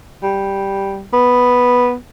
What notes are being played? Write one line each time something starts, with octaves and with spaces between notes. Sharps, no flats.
G3
B3